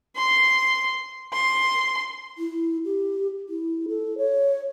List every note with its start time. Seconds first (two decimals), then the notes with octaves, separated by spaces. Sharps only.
0.17 C6
1.33 C6
2.38 E4
2.84 G4
3.49 E4
3.88 A4
4.17 C#5